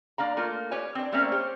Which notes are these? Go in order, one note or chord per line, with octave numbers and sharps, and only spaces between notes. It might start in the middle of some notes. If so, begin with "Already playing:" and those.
A#3 D4 F5 A#5
A3 A#3 F4
G4 B4 C#5 G#5
C4 D4
G3 A3 A#3 C4 C#4
G4 C5 C#5